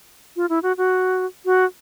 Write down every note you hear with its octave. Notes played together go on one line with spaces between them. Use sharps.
F4
E4
F#4
F#4
F#4